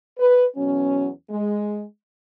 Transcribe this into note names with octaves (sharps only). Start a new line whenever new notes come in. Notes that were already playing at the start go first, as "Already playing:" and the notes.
B4
E2 B2 F#3 C#4
G#3